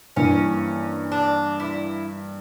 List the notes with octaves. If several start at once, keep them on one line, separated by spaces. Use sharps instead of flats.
G2 E3 A#3 C#4
D4
E4